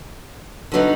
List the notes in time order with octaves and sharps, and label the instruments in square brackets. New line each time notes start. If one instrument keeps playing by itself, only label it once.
[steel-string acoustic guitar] D3 F#3 B3 D#4